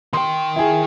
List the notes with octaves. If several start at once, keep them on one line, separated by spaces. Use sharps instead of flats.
D#3 G5 C6
E4 G#4